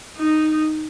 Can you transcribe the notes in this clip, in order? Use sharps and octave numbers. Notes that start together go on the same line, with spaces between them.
D#4